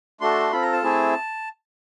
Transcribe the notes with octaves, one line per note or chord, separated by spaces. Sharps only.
A3 D4 F#4 A4 C6
C4 F4 A4 B5
A#5
A5
A3 C4 E4 G#4